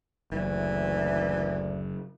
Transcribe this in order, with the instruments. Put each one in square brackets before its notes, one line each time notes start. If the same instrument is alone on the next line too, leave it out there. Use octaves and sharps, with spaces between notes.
[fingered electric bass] F#1 [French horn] D2 [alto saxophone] E3